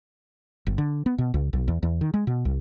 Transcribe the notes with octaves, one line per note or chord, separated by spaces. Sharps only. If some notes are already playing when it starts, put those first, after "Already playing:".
G1
D3
B3
B2
C#2
B1
E2
E2
D#3
G#3
B2
C2